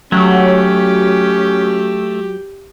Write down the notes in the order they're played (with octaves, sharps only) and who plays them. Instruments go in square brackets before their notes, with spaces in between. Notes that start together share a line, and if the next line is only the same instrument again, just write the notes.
[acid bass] F#3 [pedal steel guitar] A3 [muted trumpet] C#4 [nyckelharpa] G4 G5